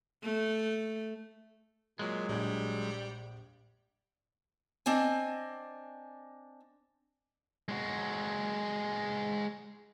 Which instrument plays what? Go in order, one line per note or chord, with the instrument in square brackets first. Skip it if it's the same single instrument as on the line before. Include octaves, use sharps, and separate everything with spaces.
[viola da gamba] A3
[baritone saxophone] A#2 [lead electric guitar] F#3 G#3
[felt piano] A#1 G#6 [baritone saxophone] G3
[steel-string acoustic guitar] C4 D4 D#5 G#5
[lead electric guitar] G#3 F#4